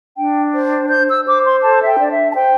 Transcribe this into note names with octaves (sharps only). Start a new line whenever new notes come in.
D4 G5
C5
C5 G6
E6
C5 D6
C6
A4 A5
E5
G5
D4 D5
E5
A5
C5 G5